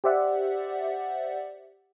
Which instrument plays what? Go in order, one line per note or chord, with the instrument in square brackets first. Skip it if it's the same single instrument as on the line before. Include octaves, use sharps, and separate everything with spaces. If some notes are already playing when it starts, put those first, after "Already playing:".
[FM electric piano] G4 C5 D5 E5 F#5